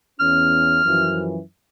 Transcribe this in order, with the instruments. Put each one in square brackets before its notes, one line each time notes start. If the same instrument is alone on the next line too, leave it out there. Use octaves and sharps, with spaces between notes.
[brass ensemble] E2 C#4 [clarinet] F6
[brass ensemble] F#2 E3 F3